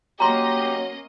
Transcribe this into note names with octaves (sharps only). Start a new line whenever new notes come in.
F#3 A#3 C#4 G4 D#5 A#5 C6